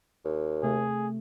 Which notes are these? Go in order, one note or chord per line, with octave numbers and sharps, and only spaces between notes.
D#2
C3 A3 G#4